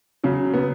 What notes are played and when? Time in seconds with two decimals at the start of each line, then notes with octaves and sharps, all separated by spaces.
0.24 C#3 F#3
0.54 B3